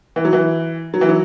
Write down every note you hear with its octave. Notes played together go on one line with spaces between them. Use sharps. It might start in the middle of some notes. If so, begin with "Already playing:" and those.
E3
F#3
E3
F#3
E3
F#3